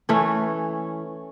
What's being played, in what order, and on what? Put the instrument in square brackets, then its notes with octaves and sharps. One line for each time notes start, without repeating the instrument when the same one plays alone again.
[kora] E3 A3 C#4